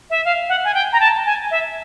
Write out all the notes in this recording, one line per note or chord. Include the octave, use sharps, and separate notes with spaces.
E5
F5
F#5
G#5
G5
A#5
A5
G#5
E5